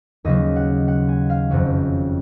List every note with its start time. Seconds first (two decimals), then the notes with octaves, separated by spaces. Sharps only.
0.25 D#2 C#3 F#3 D#5
0.56 F#5
0.88 F#5
1.09 G#5
1.30 F5
1.50 F#1 F2 D#3 F#3 F#5